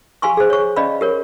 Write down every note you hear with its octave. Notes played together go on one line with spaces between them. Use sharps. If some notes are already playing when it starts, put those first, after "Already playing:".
G4 F5 G#5 C6 C#6
G#4 C5
C#5 C#6
C#4 D5 D#5 F5 B5
G4 A#4 C#5